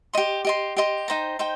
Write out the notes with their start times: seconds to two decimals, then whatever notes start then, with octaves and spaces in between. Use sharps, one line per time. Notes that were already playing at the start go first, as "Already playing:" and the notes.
0.13 G4 D#5 C6
0.45 G4 D#5 C6
0.77 G4 D#5 C6
1.08 D#4 C5 G5 A#5
1.39 D#4 C5 G5